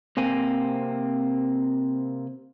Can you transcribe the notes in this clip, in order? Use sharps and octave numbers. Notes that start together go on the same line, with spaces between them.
C3 A#3 C4 G#5